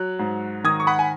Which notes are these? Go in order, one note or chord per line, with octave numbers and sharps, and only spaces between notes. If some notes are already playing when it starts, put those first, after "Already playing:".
Already playing: F#3 F#6
G#2
D#3 D#6 G#6
C#6
F#5 B5
G#5